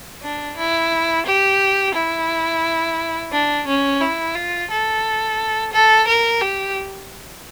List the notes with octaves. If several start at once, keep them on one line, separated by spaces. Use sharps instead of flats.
D4
E4
G4
E4
D4
C#4
E4
F4
A4
A4
A#4
G4